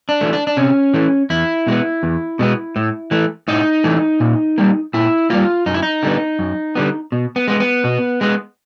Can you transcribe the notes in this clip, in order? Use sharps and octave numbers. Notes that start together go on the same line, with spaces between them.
D4
E3 A3
D4
D4
C3 C#4
E3 A3
E2 E4
B2 G#3 B3
E2
B2 G#3 B3
A2
E3 A3
A2 D#4
E3 A3
A#2
G3 A#3
A#2 E4
G3 A#3 F4
F#2 D#4
E4
D#4
D3 G3 B3
F#2
D3 G3 B3
B2
B3
G#3 B3
B3
B2
G#3 B3